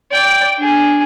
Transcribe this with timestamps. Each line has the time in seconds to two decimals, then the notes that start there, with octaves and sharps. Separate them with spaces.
0.12 D5 G5
0.58 D4 G#4